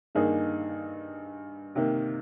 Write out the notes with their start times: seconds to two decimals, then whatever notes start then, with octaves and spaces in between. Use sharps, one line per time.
0.15 G2 D#3 A#3 D#4 G#4
1.75 C3 D#3 A#3